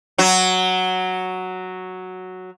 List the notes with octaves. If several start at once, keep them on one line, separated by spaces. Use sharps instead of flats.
F#3 F#4